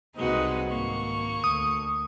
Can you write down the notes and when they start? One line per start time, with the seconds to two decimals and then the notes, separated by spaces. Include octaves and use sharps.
0.16 C2 G#3 A#3 C4 D#4 F#4 B4
0.70 G#1 A#3 C#6
1.44 D2 D#6